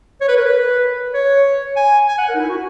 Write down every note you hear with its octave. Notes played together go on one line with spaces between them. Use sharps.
C#5
B4
A#4
B4
C#5
G#5
G#5
F#5
A#4
D#4
E4
F#4